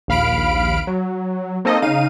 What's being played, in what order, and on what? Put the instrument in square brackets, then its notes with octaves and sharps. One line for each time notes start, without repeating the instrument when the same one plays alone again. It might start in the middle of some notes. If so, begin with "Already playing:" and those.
[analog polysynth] A#1 D#2 F5 B5 F6 D7
F#3
A#3 C4 D#4 A4 D#5
C#3 D#4 F5 D#7